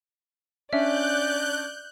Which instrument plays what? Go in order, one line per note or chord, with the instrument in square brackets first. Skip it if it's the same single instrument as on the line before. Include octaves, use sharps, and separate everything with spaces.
[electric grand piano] C#4 D4 [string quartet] D5 [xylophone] E5 [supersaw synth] F#6 G6